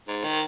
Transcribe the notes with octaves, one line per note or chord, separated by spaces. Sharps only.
G#2
D#3